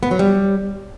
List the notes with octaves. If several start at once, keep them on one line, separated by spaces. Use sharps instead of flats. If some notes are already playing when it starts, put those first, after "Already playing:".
B3
F#3
G3